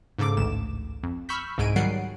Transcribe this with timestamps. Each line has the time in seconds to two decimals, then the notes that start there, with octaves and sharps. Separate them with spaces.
0.19 G#2 C#3 A4 D6
0.37 A1 D2 E7
1.03 F2
1.29 B5 C#6 E6 F6 G6 B6
1.58 C2 G#2 G#3 G#5 D7 D#7
1.76 D#3 F#3 G3 F#5 C7 D7